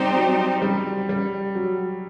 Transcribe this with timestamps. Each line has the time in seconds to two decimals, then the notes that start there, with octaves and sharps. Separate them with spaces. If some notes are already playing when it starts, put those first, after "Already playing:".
Already playing: G3 C4 D#4 G4 C5
0.16 F#3
0.62 G3
1.09 G3
1.55 F#3